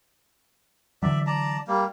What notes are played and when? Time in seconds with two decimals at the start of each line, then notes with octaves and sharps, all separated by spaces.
1.03 D3 E3 F#3 D5 E5
1.27 D5 A5 A#5
1.68 G3 A#3